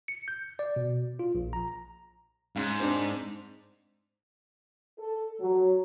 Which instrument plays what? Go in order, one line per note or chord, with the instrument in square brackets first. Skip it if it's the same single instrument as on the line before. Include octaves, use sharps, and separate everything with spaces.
[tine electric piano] C#7
G6
D5
B2
F4
A#1
A#5
[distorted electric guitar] G#2 [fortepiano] C#3
[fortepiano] C4 D4
[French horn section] A4
F#3